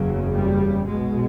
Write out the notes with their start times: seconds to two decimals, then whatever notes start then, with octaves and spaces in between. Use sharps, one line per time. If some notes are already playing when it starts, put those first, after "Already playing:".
Already playing: F#1 E2 C#3 F#3
0.32 G3
0.85 B1 B2 G#3